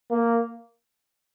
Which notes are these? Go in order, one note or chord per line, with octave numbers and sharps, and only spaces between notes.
A#3